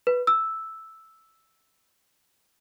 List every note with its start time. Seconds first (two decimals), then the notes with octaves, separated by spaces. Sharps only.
0.07 B4
0.27 E6